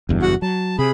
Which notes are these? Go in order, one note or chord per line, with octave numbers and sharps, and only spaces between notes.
F#1 E2 G2
F#4 F#5
F#3 A5
C3 G#4 B5